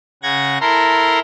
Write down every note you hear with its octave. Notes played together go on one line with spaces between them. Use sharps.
C#3 F#5 G#6 A#6
E4 A4 A#4 A#5 C6